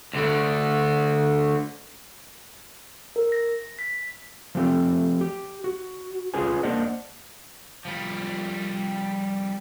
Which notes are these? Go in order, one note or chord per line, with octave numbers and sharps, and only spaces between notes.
D2 D3
A#4
A#6
B6
F3 A3 C4 G4
G4
F#4
C#4 F4 G#4 B4 G#5
A#3 D4 C5 D5 D#5 F#5
F3 G3